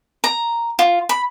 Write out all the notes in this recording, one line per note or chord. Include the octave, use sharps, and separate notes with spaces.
A#5
F4
B5